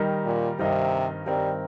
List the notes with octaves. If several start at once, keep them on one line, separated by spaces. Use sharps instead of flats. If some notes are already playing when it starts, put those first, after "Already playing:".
Already playing: D#3 G3 D#4 A#4
A#2
G2 C3 D#3 C4 D#4 A#4
G2 D#3 G3 C4 D#4 A#4